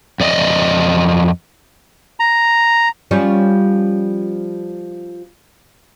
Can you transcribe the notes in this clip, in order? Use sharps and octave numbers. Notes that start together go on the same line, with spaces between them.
F2 D5 D#5
A#5
F3 G3 C#4